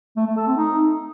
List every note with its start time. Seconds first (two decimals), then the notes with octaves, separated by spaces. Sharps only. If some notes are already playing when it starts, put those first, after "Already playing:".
0.17 A3
0.27 A3
0.37 A4
0.47 C4
0.57 D#4